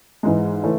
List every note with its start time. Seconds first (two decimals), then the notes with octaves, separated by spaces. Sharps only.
0.23 G#2 E3 G#3
0.63 C#3 E3 A3 C#4